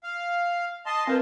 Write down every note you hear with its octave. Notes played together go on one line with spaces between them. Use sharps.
F5
D#5 A5 C6
C4 F4 A#4 B4